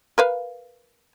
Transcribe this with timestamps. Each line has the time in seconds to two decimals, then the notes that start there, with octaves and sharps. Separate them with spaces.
0.18 A#4 B4 F5